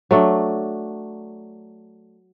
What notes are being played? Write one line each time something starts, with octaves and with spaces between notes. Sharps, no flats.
F#3 A3 D4